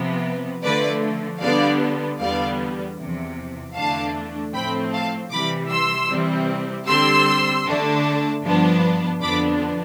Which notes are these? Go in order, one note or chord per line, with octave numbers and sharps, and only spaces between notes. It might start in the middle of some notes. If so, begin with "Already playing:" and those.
Already playing: C3 F3 B3
D3 F3 A3 B4 D5
D3 G3 B3 D4 D5 F5
E2 D3 G3 B3 D5 F5
E2 C3 F3
E2 D3 A3 D4 F5 A5
A2 F3 A3 C4 G5 B5
F5 A5
C3 E3 G3 B5 D6
C6 E6
C3 E3 G3 C4
D3 G3 C4 C6 E6
D3 A3 D4
G2 F3 B3 D4
F2 D3 F3 B3 D4 B5 D6